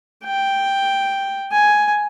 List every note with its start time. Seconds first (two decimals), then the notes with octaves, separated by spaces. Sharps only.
0.24 G5
1.52 G#5